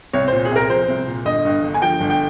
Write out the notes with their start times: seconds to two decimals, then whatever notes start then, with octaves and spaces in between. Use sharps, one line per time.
0.13 C2 C#5
0.28 A#2 C5
0.45 G#4
0.51 C2
0.56 A#4
0.70 F3 C5
0.88 C2
1.07 A#2
1.25 G1 D#5
1.45 G2
1.63 G1
1.74 G#5
1.82 F3 G5
2.01 G1
2.10 G5